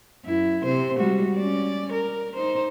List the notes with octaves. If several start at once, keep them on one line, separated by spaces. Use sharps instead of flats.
F#2 E4
C3 C5
G3 G#3 F#4
C#4 D5
A#4
D#4 C5